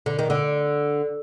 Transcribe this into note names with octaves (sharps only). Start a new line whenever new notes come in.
D3
D#3
D3